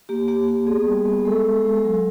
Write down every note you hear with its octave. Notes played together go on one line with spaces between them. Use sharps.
A#3 G4
A#3 G4
A#3 G4
B3 G#4
G3
B3
G#3 A4
G#3
G#3
F#3